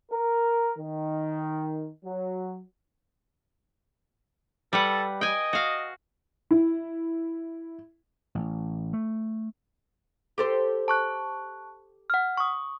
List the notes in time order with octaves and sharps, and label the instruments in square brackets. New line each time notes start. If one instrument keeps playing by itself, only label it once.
[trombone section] A#4
D#3
F#3
[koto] G3 B4 F#5 [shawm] A4
[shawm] D#5 [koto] G5 G#5
[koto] F#4 F5
[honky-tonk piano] E4
[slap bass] A1
A3
[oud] G4 A4 C5
[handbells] A5 C#6 F#6
F#5 F6
C#6 D#6